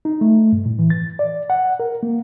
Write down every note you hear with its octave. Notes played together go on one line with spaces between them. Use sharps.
D#4
A3
G2
A2
E3
A6
D5
F#5
A#4
A#3